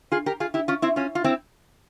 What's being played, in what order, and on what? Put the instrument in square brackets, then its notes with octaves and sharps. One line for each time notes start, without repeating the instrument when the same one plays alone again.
[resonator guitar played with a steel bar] F4 G#4
G4 A#4
F4 G#4
E4 G4
C#4 F4
C4 E4
C#4 F4
F4
C4 E4